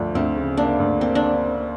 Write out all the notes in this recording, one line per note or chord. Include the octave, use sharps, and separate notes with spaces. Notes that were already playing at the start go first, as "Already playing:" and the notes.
Already playing: D2 F3 D4
D2 C4
C#3
A#3 D4
D2
A#3 C4
D4